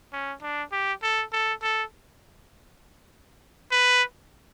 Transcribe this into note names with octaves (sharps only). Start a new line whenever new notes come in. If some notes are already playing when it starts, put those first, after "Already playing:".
C#4
D4
G4
A4
A4
A4
B4